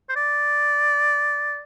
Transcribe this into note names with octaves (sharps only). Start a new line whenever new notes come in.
C5
D5